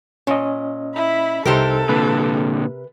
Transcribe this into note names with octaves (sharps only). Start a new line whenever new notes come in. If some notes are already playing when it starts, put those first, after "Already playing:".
A#2 C#4 D#5
E4 B5
C2 C3 D#4 G4 A4 A#4 C5
A#2 D3 B4